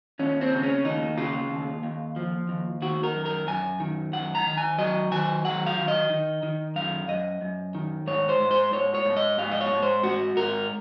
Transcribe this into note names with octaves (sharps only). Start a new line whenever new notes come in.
D#2 C#4
C4
C#3
C#4
D#2 D#4
C#3 F4
D#2
D#2
F3
D#2
D#3 F#4
A#4
F#2
A#4
F#2 G#5
D#3
F#2 F#5
A#5
D#3
G#5
F#3 D#5
D#3 G#5
F#3 F#5
F5
D#3
D#5
D#3
D#3
F#2 F5
F#2 D#5
F#2
D#3
G#2 C#5
C5
G#2
C5
G#2 C#5
C#5
G#2
D#5
G#2 F5
D#5
C#5
G#2
C5
G#2 F#4
G#2 A#4